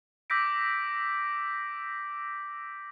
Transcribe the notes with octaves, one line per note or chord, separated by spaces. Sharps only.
D6 E6 G6 A#6 B6 D7